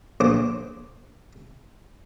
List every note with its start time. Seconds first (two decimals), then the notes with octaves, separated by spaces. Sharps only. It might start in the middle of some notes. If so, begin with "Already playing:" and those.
0.20 A#1 C5 D6